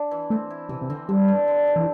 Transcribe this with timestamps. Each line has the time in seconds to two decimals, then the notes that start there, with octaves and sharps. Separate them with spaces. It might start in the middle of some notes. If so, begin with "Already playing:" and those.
Already playing: D4
0.11 E3
0.30 A3 C4
0.50 E4
0.69 C3 E3
0.81 C3
0.90 D3 C4
1.09 D3 G3
1.28 G2
1.48 D3
1.67 G2
1.76 E3